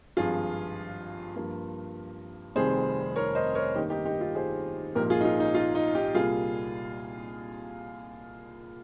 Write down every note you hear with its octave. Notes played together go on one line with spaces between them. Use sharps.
G#1 G2 F3 F4 G#4
G2 F3 A#3
F1 F2 D#3 G3 G#4 C5
A#4 C#5
C5 D#5
A#4 C#5
G2 D#3 A#3 D#4 G4
D#4 G4
D#4 G4
F4
G#4 C5
A#1 G#2 F3 A#3 G4 A#4
F4 G#4
D#4
F4
D#4
F4
D#4
D#4 G4
C2 A#2 G3 A#3 F4 G#4